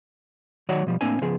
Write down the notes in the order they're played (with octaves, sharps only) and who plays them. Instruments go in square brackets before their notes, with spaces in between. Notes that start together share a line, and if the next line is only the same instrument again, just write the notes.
[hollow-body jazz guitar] D#3 F#3 F#4 C#5 D5 F#5
B2 F3 G3
A2 A#3 C4 D4 G#5
C#3 F3 B3 G#4